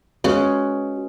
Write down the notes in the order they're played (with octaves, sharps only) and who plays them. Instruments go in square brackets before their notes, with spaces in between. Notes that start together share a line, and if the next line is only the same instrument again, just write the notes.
[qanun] G#3 C#4 [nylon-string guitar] F#4 B4 F5